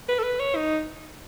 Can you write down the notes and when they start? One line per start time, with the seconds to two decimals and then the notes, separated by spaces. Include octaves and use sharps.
0.08 B4
0.18 A4
0.23 B4
0.40 C#5
0.56 D#4